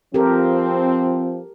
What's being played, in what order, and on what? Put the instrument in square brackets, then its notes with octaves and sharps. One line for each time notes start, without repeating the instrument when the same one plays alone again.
[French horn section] F3 C4 [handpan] G4 A4 A#4